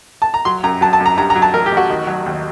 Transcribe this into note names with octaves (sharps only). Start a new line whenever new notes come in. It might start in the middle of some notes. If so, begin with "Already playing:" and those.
A5
A#5
F#3 C6
F#2 A#5
F#3 A5
A5
F#2
A#5
G2 A#5
A#5
F#3
A5
A1 A#4
G4
A1
F#4
D#3
F#3
D#2